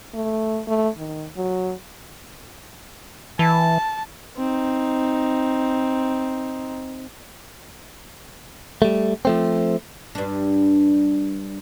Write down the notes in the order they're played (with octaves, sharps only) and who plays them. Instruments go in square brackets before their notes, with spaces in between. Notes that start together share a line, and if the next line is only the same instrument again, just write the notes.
[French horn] A3
A3
D#3
F#3
[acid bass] E3 [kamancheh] A5
[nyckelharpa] C4 D#4
[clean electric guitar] G3 A3
F3 A3 C4
[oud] G2 D4